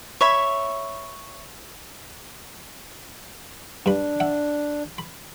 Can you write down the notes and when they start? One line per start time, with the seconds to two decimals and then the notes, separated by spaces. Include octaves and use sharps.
0.21 C#5 E5 B5
3.86 G2 D4 B5
4.20 E5 F#5
4.98 B5